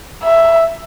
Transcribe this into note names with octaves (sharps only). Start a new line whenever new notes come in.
E5